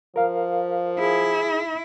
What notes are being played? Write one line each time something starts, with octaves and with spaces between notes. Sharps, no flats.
F3 A#4 F5
E4 G#4